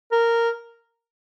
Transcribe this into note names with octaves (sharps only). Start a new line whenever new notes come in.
A#4